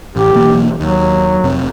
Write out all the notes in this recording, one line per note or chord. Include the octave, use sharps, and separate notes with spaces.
A1 G4
B1 E3 A#3
D#2 F#3
F1 C3 C4